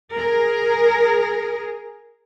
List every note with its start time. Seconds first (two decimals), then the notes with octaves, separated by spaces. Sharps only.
0.13 G#4 A#4